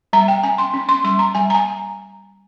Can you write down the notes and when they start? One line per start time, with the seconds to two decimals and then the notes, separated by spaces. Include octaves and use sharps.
0.13 G3 A#5
0.28 G5
0.43 C#4 G#5
0.58 C6
0.74 C#4
0.89 C6
1.04 G3 C6
1.19 A#5
1.35 G3 G#5
1.50 A#5
1.54 G#5